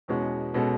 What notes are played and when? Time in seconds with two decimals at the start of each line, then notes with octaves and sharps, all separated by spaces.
0.08 E2 B2 G#3 C#4 F#4
0.54 B2 G#3 C#4 F#4 A4